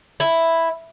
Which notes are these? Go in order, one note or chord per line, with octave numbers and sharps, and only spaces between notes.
E4